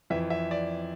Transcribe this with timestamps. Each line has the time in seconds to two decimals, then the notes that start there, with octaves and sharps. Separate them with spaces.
0.10 F2 E3 E5
0.30 E5
0.51 D5